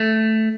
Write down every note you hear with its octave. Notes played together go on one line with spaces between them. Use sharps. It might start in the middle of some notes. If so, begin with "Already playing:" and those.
Already playing: A3